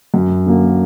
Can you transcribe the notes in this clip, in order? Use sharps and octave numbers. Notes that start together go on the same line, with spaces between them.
F#2
D3 F#3 A#3 C#4